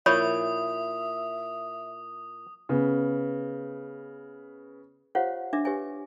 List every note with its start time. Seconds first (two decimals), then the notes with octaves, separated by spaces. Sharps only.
0.06 A#2 E4 C#5 E5 B5 C#6 D#6
2.69 C#3 B3
5.15 F4 G4 C5 C#5 F5 F#5
5.53 D4 E5 D6
5.65 G4 B4 C#5 E5 G#5